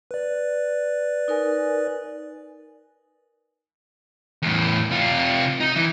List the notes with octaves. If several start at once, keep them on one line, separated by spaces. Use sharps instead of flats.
B4 D5
D#4 A#4 G#5
E2 A2
C3 F4
D#4
E3